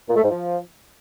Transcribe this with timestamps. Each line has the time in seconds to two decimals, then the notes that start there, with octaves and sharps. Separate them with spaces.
0.09 A#2
0.16 A3
0.23 G#2
0.30 F3